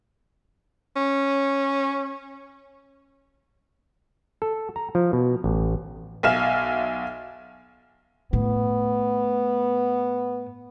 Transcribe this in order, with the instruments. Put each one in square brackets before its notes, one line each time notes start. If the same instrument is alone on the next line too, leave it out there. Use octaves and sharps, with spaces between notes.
[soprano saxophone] C#4
[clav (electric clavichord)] A4
A#5
F3
B2
A1
[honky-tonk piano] B1 E5 F5 G#5 F6 E7
[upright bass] A2 [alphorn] B3